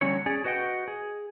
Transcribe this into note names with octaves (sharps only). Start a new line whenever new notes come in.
D3 F#3 G3 C#4 E4 C#5
C#4 G#4 D5
F#4 B4 D#5 F#5 G5
G#4